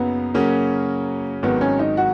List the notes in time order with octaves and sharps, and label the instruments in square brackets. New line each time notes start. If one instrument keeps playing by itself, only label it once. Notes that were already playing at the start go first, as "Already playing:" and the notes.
Already playing: [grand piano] F#2 C#3 F#3 A#3 D#4 [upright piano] B3
[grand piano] C#3 F#3 C#4 F#4 [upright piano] A#3
[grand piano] G#1 G#2 D#3 F#3 [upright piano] B3
[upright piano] C#4
D#4
F#4